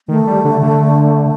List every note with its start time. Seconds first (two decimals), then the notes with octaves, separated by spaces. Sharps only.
0.08 D#3 A3
0.27 G3
0.45 D3
0.63 D3